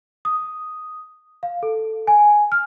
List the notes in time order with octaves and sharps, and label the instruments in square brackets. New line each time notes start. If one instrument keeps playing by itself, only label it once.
[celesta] D#6
F5
A4
G#5
F6